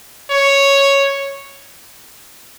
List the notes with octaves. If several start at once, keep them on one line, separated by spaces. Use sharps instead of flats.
C#5